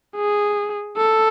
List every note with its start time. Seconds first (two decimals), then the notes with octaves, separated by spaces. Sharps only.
0.16 G#4
0.97 A4